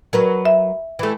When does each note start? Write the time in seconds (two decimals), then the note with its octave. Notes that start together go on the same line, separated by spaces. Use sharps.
0.13 F#3 A#4 B4
0.45 E5
0.99 E3 A3